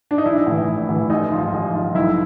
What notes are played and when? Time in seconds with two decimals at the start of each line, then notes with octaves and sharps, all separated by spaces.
0.11 D4
0.18 D#4
0.25 A#1 E4
0.47 A2 E3
0.67 A#1
0.89 A2 E3
1.10 A1 D#4
1.32 G#2 F3
1.53 A1
1.74 G#2 F3
1.95 B1 E4